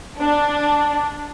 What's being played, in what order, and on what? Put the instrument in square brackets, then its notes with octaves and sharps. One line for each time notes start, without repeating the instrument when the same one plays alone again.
[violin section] D4